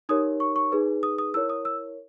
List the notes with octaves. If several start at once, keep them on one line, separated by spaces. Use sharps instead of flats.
D#4 G4 A#4 C#5 D#6
C#6
C#6
D#4 G#4 B4
D#6
D#6
E4 A#4 C#5 E6
D#6
E6